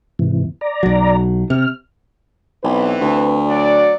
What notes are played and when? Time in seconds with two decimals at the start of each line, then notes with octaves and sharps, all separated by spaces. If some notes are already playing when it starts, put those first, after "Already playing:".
0.19 G#2 C3 E3
0.61 D5 A#5
0.83 B1 F#3
1.50 C3 F6
2.64 B1 E3 C4 B4
3.01 D2
3.47 F#3 F#4 D5